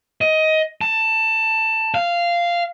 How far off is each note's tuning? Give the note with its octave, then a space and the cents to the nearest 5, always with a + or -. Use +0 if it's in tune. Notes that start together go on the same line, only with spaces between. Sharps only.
D#5 +15
A5 +15
F5 -10